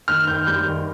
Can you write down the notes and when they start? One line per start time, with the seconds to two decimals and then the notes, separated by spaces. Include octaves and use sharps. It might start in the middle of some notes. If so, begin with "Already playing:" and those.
0.08 D#3 F6
0.27 D#3 G6
0.47 G3 G6
0.67 D#3